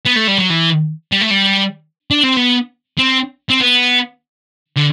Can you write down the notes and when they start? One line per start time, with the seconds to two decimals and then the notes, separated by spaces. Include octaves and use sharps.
0.06 B3
0.17 A3
0.28 G3
0.38 F#3
0.50 E3
1.12 G3
1.21 A3
1.31 G3
2.11 D4
2.23 C4
2.37 B3
2.98 C4
3.50 C4
3.60 B3
4.77 D3